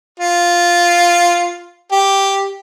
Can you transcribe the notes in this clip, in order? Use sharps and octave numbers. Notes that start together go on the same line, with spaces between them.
F4
G4